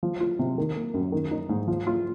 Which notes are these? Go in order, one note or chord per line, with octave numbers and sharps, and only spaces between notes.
F3
F4
C3
D#3
A#3
F#2
D#3
D#4
G#2
F3
F4